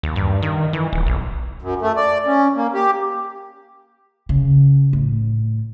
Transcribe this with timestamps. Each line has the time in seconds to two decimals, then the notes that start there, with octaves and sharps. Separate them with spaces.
0.03 D#2
0.16 G2
0.42 D#3
0.73 E3
0.93 D#1
1.07 B1
1.62 F#2
1.82 A3
1.96 D5
2.27 C#4
2.56 A#3
2.74 G4
4.29 C#3
4.93 A2